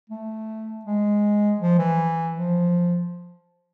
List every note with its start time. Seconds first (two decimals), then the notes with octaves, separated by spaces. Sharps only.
0.10 A3
0.85 G#3
1.60 F3
1.79 E3
2.35 F3